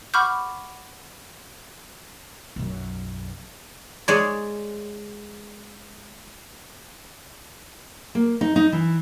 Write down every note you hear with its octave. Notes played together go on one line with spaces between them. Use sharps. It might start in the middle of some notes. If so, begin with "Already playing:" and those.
F#5 B5 C#6 D6 F6 G6
B1 F#2
G#3 C#5 D5
A#3
D#4
D#4
E3